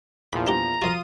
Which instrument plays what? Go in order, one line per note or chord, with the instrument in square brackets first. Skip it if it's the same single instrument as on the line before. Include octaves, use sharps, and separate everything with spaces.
[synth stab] E2 A#2 F3 [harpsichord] B5
[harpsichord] D4 G4 F#5 [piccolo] A#5
[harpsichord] F2 F#4 [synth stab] F4 D#6 D#7